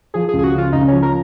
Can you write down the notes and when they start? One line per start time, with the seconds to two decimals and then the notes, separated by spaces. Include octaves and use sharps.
0.14 F3 G#4
0.29 G#4
0.33 C#2
0.39 G#4
0.44 F#4
0.53 C#3
0.58 F4
0.73 C#2 D#4
0.88 F3 C#4
1.03 A#4